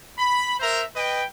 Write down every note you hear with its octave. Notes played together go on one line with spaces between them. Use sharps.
B5
A#4 C5 E5 A#5
B4 D#5 G5